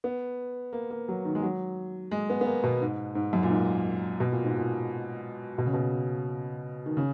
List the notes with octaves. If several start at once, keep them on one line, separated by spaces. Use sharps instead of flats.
B3
A#3
A#3
F#3
D#3
G#3
F#3
G#3
B3
B3
A#3
B2
G#2
G#2
F#2
A#2
G#2
B2
A#2
G#2
A#2
B2
C#3
B2
D#3
C#3